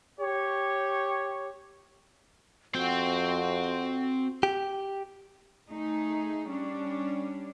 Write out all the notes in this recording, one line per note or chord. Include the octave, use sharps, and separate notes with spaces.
G4 C#5
F2 C4 F#4 G5
G4
A3 D#4 G#4
G3 C#4 D4